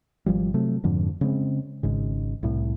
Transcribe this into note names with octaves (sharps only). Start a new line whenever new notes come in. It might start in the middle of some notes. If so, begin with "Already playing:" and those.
G#1 F3 G3
C3 F#3 A3
F2 G#2 D3 F3
C#3 G#3 C4
G#1 G#2 C#3
C2 A2